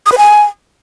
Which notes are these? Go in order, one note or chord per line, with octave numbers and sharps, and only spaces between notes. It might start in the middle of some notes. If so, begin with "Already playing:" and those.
D#6
B4
G#5